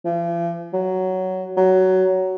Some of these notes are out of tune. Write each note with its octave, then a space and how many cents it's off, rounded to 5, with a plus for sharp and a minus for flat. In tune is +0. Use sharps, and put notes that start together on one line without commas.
F3 -45
F#3 +10
F#3 +15